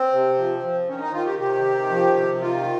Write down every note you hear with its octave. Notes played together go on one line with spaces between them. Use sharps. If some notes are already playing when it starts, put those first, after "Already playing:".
Already playing: C4
C3
F3
F3
D#3 C#4
D#4
D#3 F4
G4
C3 G4
D#3
F3
C3
D#3 F4